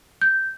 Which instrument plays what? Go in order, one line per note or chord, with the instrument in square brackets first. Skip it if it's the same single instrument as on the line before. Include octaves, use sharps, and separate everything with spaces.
[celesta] G6